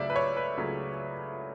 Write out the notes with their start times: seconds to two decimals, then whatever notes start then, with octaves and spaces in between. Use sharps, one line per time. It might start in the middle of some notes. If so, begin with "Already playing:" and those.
Already playing: C#2 C#3 F#3 A3 D5 E5
0.10 B4
0.16 C#5
0.37 B4
0.57 C#2 C#3 F#3 A3